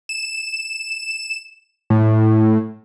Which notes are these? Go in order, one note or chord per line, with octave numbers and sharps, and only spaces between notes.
E7
A2